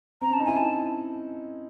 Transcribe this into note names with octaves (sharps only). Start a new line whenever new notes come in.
C4 A#5
C#4 A5
D#4
E4 G#5
E4 A5